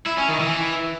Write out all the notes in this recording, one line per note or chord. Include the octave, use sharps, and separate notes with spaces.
E4
C#4
D#3
E3